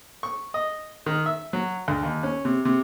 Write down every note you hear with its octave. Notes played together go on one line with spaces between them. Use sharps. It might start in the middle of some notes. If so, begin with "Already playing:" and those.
C#6
D#5
D#3
E5
F#3
D2
D#2
C#4
C3
C3